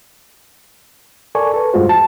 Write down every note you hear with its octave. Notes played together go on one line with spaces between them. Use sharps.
A4 A#4 D5 G#5 C#6
A4 B4
E2 G2 G#3 F4 F#4 C5
A5